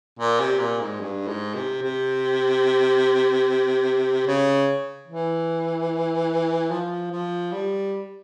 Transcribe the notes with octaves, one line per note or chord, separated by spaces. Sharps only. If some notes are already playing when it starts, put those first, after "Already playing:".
A#2
C3
A#2
G#2
G2
G#2
C3
C3
C#3
E3
F3
F3
G3